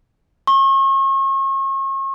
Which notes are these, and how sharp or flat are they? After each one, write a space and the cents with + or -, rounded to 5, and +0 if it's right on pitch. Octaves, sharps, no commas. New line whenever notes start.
C#6 -40